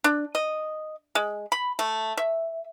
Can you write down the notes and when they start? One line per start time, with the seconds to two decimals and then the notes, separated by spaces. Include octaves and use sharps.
0.04 D4
0.35 D#5
1.15 G#3
1.52 B5
1.79 A3
2.17 E5